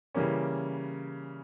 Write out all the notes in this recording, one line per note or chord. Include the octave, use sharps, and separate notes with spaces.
C#3 E3 G3 A#3 C#4